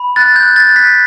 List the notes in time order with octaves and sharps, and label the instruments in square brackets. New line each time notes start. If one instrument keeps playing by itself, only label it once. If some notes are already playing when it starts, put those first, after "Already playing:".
Already playing: [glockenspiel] B5
F#6 A6
G6
F#6
A6
F#6
B6